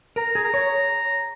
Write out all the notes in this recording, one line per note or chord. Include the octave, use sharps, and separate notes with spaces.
A#4 A#5
G#4
A#5
C#5